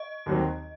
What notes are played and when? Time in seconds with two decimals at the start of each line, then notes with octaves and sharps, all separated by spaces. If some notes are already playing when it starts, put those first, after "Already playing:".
Already playing: D#5
0.26 D#2 D#3 F#3 C4